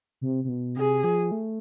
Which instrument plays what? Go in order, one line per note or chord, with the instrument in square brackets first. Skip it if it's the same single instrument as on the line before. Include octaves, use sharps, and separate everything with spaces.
[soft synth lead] C3
C3
B2
[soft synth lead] C3 [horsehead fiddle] G#4
[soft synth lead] F3
A3